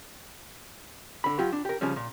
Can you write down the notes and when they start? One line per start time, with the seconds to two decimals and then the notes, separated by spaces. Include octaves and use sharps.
1.24 D3 B5
1.39 F#3 F4 G4
1.53 D4
1.65 G4 A#4
1.81 C#3 F3 G3 C#4
1.96 A#2